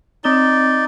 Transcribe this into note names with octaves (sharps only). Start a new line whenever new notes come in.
C4 D#4 D5 D#6 G7